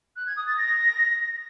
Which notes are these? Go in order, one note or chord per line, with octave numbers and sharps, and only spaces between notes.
F#6
G#6
D#6
A6
A#6